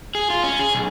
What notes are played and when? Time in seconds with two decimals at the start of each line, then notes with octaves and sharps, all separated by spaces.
0.15 G#4
0.30 F4
0.44 C#4
0.59 G#4
0.75 B1